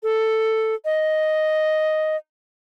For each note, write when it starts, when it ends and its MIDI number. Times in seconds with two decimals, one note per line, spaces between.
0.03 0.75 69
0.85 2.16 75